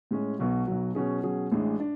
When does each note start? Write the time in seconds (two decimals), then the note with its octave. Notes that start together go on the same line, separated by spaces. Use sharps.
0.11 A2 G#3 C#4
0.39 B1 B2 F#3
0.67 B1 B2 F#3
0.95 B2 F#3 C#4 G#4
1.23 B2 F#3 C#4 G#4
1.52 A1 A2 G#3 D4
1.80 D4